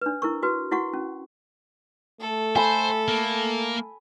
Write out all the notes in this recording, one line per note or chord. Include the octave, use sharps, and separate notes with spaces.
D4 B4
E4 A#4 C#6
F#4 B4
E4 F#4 F#5 C#6
C#4
A3 A4
C5 G#5 B5
A#3